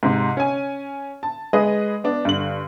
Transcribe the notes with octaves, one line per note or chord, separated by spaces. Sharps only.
G#2 C3
C#4 G#5
A5
G#3 G#4 B4 D#5
B3 D4
G2 D3 F#7